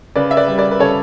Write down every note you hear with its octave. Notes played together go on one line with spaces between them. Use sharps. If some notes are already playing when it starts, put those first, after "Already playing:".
C#3 B4 D5
E5
B4 D5
G3
B4 D5
B4
C#3 A4 C#5